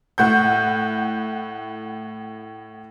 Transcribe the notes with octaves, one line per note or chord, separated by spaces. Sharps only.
A2 F#5 G6